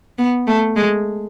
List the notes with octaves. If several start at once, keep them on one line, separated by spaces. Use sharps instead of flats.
B3
A3
G#3